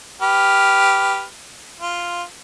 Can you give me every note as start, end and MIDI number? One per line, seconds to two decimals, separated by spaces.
0.22 1.22 67
0.22 1.22 71
0.22 1.22 89
1.80 2.22 65